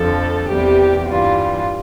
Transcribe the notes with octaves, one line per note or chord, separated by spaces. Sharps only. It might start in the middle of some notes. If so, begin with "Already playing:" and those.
Already playing: F2 D3 F3 A4
E2 C3 G3 G4
G2 E3 G3 F4